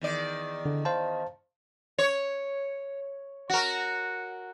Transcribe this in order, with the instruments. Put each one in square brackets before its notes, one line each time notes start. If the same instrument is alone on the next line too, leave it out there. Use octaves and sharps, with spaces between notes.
[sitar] E2 D#3 D5
[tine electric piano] D3
C5 F5 A5
[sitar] C#5
F#4 A#4